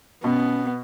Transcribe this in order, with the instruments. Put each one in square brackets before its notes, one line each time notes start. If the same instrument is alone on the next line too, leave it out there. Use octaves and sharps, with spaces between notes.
[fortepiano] B2 [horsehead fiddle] B3 [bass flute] C#4